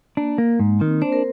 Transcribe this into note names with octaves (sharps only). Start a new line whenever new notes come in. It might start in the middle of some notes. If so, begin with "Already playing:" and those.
A#3 D4
A#3
G#2
D#3 C4
D4 C5
A#4